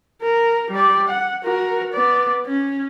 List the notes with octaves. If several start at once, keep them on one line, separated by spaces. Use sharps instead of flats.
A#4
G3 D5
F#5
F#4 A#4
B3 D5
C#4